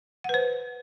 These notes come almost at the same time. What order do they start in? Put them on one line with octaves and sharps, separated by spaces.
F#5 B4 C5